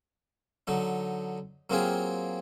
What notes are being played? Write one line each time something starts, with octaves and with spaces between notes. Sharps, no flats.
D3 F#3 D#4
F#3 A#3 C4 F4 G4 G#4